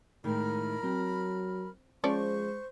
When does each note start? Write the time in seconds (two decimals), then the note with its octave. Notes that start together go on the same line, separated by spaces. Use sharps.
0.24 A2 D#3 G#3 A#4 B5 F6
0.83 F#3 C4
2.04 F3 G#3 C#4 C5 D5 C#6